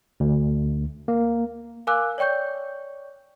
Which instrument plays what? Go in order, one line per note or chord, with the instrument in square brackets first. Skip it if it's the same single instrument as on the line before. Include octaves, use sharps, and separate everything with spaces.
[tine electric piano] D2
A#3
[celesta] A#4 F5 G#5 D6 E6 F#6
C#5 D5 G5 C#6 G6